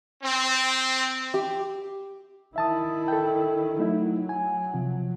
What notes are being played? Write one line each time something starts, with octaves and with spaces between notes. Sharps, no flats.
C4
G4
D#3 E4 E5 A5 D#6
A4 G5
F#3 A3 D#4 E4
G#5
C3 F3